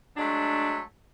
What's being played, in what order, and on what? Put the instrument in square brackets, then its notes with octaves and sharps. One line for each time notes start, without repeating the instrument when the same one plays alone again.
[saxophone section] F#3 G#3 A3 D4